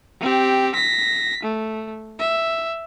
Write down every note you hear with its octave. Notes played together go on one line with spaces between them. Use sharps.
C4 G4
A#6 B6
A3
E5